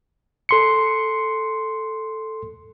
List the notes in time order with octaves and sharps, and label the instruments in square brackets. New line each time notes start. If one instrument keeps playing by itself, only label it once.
[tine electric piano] A4 C6 C#7